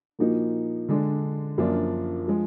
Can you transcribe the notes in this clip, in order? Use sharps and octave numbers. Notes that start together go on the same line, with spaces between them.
A#2 F3 A#3 D#4 F#4
D3 G#3 D4
F#2 F3 A#3 D4 F4
F3 G#3